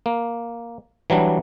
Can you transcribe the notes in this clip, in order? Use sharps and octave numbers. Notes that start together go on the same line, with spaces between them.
A#3
E3 F#3 G3 D4